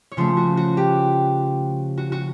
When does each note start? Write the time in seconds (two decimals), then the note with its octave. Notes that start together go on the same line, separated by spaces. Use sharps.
0.12 C#5
0.17 C#3 F3 A3 C5
0.37 F#4
0.57 F#4
0.77 G4
1.98 F#4
2.12 F#4